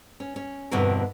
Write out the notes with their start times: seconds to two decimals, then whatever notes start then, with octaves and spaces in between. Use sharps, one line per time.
0.20 C#4
0.36 C#4
0.71 E2 G2 B2 D3 C4 A#4